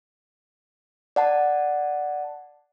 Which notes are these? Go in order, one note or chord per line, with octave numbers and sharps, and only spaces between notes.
D5 F#5 A5